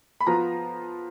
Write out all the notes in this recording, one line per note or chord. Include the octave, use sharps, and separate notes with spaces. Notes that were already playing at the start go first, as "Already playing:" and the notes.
B5
F3 B3 F4 A#5